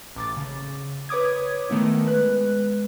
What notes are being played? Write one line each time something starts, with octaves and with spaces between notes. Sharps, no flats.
A1 D6 A6
C#3
B4 C#5 D6 D#6 G#6
D#3 A3 B3 E4
G#3 B4 F#6